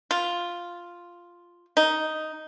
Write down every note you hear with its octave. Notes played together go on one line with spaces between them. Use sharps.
F4
D#4